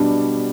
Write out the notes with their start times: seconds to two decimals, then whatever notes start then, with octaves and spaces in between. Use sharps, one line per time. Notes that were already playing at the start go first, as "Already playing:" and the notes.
Already playing: B2 G3 B3 D4